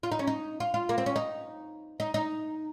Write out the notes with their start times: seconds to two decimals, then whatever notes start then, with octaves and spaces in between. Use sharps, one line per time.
0.03 F4
0.12 D#4
0.19 C#4
0.27 D#4
0.60 F4
0.74 F4
0.89 A#3
0.98 C4
1.06 C#4
1.16 D#4
2.00 D#4
2.14 D#4